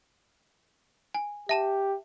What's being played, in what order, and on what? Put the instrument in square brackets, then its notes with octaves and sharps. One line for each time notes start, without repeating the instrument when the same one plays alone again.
[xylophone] G#5
[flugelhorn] G4 [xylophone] E5 A5 E7